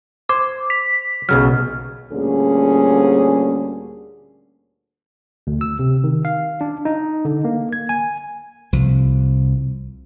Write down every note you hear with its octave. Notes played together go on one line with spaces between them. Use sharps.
C5 D6
B6
B1 C#3 F#3 F6
D2 A#2 G3 A#3 C#4 G#4
D2
E6
C3
D#3
F5
D4
D#4
D3
A#3
G#6
G#5
C2 F3